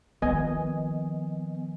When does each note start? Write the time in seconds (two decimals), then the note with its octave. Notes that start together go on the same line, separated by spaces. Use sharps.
0.22 D#3 F3 B3 D#5 G#5